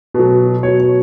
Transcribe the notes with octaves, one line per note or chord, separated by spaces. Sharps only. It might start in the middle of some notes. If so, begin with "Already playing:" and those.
B2 F#3
B2 F#3 C#5
C#5